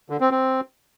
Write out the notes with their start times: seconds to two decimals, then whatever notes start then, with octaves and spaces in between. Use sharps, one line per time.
0.10 D3
0.20 C4
0.31 C4